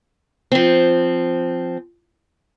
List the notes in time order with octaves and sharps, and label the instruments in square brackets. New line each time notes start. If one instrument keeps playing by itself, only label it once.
[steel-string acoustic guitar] F3 C4